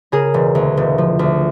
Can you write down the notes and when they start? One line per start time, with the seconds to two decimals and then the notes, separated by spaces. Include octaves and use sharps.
0.12 C#3 G#4 A#4
0.34 E1
0.55 D2
0.77 E1
0.98 F3
1.19 D2